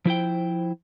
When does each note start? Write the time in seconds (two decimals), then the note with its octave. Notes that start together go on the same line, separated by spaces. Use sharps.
0.05 F3 E4 C5 G5